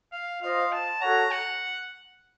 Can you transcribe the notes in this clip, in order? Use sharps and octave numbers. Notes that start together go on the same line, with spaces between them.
F5
F4 C5 D#5 F5
A5
F#4 A4 C#5 F#5 A#5
F#5